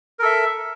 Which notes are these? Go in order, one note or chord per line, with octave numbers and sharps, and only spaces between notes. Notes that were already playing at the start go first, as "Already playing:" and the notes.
A4 A#4 E5